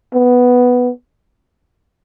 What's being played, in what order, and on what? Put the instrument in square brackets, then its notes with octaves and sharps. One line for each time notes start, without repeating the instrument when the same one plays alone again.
[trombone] B3